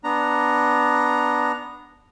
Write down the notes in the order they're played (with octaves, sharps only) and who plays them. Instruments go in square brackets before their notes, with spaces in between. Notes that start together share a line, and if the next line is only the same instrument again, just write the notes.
[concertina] B3 D4 A#5